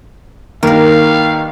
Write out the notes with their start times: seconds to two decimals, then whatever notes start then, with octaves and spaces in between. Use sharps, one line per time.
0.63 G2 D#3 A#3 A#4 D5 F5